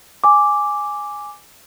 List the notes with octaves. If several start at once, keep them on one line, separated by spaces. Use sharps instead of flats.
G#5 D6